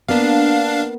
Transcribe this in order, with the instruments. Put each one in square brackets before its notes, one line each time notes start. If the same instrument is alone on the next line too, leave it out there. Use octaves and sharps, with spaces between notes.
[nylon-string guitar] A#3 B3 [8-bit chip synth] D4 F5